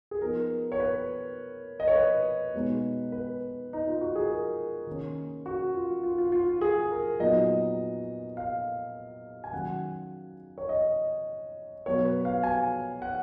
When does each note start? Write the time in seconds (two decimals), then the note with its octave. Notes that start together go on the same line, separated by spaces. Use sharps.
0.11 G#4
0.21 F3 B3 D#4 A#4
0.72 C#5
0.80 B4
1.80 D#5
1.88 C#5
1.96 B4
2.54 B2 G#3 B3 D#4
3.12 B4
3.73 D#4
3.88 F4
4.01 F#4
4.15 G#4
4.29 A#4
4.87 D#3 A#3 C#4
5.46 F#4
5.74 F4
6.03 F4
6.18 F4
6.32 F4
6.48 F4
6.61 G#4
6.91 A#4
7.20 A#2 F#3 B3 D#4 D#5
8.37 F5
9.44 G#5
9.52 D#3 F#3 C#4 F#5
10.58 C#5
10.69 D#5
11.86 B2 F#3 B3 C#5
12.05 B4
12.25 F5
12.43 G#5
13.02 F#5